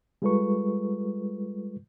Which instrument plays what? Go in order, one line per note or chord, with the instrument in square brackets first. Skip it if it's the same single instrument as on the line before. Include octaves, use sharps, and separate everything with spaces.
[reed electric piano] G3 G#3 F4 A4 B4 C#6